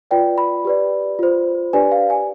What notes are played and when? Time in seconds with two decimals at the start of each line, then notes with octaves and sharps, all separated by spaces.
0.11 F4 B4 D5 G5
0.38 B5
0.65 G4 B4 D5
1.19 F4 C5
1.73 D4 G4 B4 D5 G#5
1.92 F5
2.10 G#5